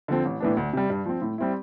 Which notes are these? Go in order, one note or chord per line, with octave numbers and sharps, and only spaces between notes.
D3 F3 C4
A1
A2 E3 B3 D4
D2
C3 G3
G2
F3 C4
A2
G3 C4 E4